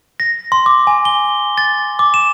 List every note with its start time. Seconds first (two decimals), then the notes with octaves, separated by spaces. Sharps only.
0.20 A#6
0.52 C6
0.66 D6
0.87 G#5
1.05 G7
1.58 A6
1.99 D6
2.14 E7